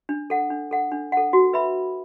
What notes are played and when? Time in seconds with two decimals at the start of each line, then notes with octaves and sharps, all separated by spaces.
0.09 D4
0.30 A4 F#5
0.50 D4
0.71 A4 F#5
0.92 D4
1.12 A4 F#5
1.33 F#4
1.53 B4 E5 B5